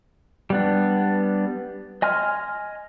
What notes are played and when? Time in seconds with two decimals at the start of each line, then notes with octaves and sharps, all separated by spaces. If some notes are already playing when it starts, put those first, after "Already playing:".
0.50 G3 B3 D4
2.02 D#5 G#5 C6 F6